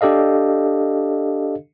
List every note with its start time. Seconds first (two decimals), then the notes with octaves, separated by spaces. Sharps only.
0.01 D4 G4 A4 D#5 F5